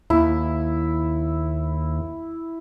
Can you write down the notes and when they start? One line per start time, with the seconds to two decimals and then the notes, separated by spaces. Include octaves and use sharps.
0.10 D#2 E4